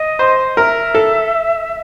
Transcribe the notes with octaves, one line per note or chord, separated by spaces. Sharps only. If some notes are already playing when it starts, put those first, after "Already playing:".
Already playing: D#5
C5
A#4 E5
A4